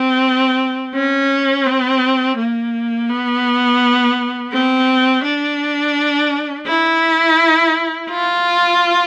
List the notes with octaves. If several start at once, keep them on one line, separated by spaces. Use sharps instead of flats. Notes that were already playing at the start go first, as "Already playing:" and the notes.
Already playing: C4
C#4
C4
A#3
B3
C4
D4
E4
F4